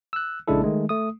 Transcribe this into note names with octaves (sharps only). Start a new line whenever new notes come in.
E6 F#6
A#1 C#3 G#3 D4 E4 A4
D#3 G#3 A3
A3 D#6